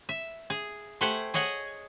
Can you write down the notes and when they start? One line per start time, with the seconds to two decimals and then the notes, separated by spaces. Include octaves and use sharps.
0.09 E5
0.50 G#4
1.01 A3 G4 C5 F#5 G#5
1.34 G#4 C#5 D#5 F#5 G#5